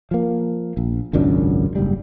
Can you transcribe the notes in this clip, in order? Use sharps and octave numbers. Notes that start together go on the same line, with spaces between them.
F3 A#3
A#1
G#1 C#2 F#2 D4
F#1 G#2 G3